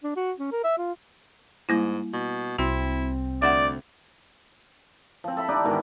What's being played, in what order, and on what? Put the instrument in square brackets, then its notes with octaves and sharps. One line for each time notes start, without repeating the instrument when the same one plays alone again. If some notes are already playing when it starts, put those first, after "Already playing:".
[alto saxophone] D4
F#4
C#4
A#4
E5
F4
[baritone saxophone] G#2 [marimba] G3 A#3 E4
[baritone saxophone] B2
[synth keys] C2 C4 [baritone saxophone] E4 [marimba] F#4
[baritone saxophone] D2 [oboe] D5 [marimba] E5 F#5
[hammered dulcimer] F3 C4
A4 E5 B5
D4 D#4 G4 D5
G#2 B2 D#3 E3